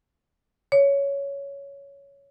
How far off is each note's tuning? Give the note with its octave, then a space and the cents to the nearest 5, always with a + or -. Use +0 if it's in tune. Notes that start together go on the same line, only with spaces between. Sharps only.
C#5 +10